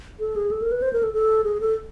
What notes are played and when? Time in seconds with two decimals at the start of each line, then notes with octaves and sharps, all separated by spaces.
0.20 A4
0.36 G#4
0.51 A4
0.62 A#4
0.72 B4
0.82 C5
0.93 A#4
1.03 A4
1.13 A4
1.44 G#4
1.61 A4